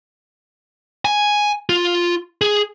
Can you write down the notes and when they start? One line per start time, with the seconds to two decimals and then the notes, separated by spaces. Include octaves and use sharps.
1.05 G#5
1.69 F4
2.42 G#4